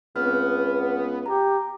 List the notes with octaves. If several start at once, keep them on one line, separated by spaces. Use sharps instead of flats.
C#2 B3 C4 F6
G4 A#5